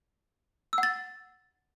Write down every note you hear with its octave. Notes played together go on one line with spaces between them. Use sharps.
E6
F#5
A6